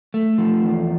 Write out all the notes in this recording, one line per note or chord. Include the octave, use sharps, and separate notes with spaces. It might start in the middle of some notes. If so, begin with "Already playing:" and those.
A3
F3
E2